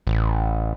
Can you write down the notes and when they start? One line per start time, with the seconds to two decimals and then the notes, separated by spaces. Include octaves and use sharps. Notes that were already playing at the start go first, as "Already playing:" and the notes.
0.07 A1